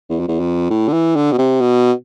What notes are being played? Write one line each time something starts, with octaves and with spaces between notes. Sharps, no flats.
E2
F2
E2
F2
A2
D3
E3
D3
B2
C3
B2